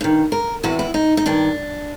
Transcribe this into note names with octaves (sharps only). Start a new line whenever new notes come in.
G2 D#3
A#4
E2 C3 E3 F#4
E4
D#4
D#4
G2 D#3 D4